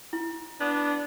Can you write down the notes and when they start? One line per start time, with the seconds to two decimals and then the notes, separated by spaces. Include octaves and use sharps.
0.13 E4
0.61 B3 D4